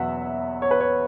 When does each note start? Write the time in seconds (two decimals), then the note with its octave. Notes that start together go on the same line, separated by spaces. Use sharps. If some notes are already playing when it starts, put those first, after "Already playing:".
Already playing: E2 B2 F#3 B3 E5 F#5
0.62 C#5
0.71 B4
0.81 C#5